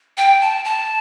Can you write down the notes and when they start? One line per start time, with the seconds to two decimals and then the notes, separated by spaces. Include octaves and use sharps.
0.17 G5
0.41 A5
0.65 A5